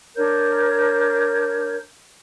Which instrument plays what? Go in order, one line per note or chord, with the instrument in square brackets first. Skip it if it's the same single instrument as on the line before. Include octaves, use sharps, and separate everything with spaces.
[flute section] D4 A#4 C#5 G6